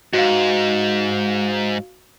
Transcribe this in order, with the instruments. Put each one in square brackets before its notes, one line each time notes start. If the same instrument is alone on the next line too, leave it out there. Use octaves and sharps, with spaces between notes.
[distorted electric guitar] G#2 [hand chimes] F#4 F5